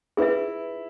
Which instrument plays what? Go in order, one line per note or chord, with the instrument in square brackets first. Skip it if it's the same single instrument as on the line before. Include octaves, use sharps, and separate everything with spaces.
[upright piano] E4 [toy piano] G#4 B4 E5